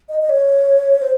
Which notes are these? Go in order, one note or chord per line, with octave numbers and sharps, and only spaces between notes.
D#5
D#5
C#5
C5